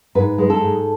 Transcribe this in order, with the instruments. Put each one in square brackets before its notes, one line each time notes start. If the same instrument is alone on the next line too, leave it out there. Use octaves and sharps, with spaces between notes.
[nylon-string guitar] G#2 B4
G#3
A4
G#2